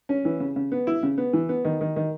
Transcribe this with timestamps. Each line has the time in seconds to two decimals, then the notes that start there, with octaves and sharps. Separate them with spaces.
0.09 C#4
0.25 E3
0.40 C#3
0.56 C#3
0.72 B3
0.87 E4
1.03 C#3
1.18 B3
1.33 E3
1.49 B3
1.65 D#3
1.81 D#3
1.96 D#3